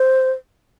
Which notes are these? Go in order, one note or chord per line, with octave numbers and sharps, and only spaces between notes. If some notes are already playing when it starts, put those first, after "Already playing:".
Already playing: C5